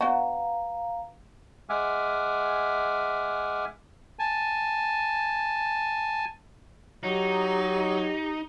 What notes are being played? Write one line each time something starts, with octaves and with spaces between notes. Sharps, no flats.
B3 D4 F#4 F5 A#5
G#3 E5 F#5 G#5 D6 F6
G#5 A5
F#3 D#4 G4